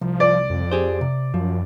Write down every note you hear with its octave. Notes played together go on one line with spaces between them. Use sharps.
C2 F3
D5
F2
G4 G#4 C5
C3
F#2 F3